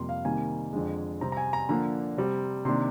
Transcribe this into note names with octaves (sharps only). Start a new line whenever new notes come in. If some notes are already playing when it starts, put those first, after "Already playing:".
Already playing: F2 C3 G3 A#3 C6
F5
C3 D#3 G3 A#3 G#5
F2 D3 G#3
C3 G3 C4 A#5
A#5
G#5
A#5
D3 F3 A#3 D4 A#5
C3 G3 C4
C3 D#3 A#3 D4 C6